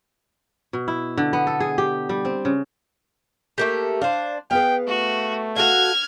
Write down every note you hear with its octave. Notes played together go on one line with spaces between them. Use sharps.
B2
E4
D3
B3
A4
G#4
G4
G3
C4
C#3
A3 A#3 G4
D4 C5 F5
B3 G#4 B4 F5 G5
A3 F#4
F#4 A4 F5 F6 G#6